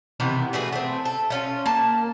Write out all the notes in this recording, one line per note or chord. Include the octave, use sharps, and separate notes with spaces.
C3 D#3 E3 B3
A3 F#4 G#4 B4
A3 C4
A4
A3 C#4 F4
A#3 A5